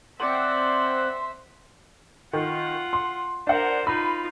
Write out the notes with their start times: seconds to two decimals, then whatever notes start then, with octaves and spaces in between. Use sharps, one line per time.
0.20 C4 C5 D5 E5 F#5 C6
2.33 D#3 F4 F#5
2.93 C6
3.47 D4 A#4 C5 F#5
3.87 D#4 F4 B5